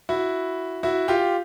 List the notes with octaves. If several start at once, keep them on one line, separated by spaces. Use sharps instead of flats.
E4 F#4
E4 F#4
F4 G4